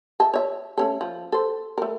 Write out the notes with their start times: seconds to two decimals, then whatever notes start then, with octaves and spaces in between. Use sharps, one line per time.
0.20 D#5 E5 A5
0.34 C#5 E5
0.78 A3 C#4 A4
1.01 F3
1.32 A4 C5
1.78 A3 A#4